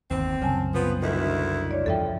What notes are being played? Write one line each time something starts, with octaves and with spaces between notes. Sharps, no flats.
G1 D#2 C4
C2 F#2 C#3 G#5 A5
F3 B3
D2 D#3 E4
D4 C#5 D5
E2 G2 F3 A4 E5 G5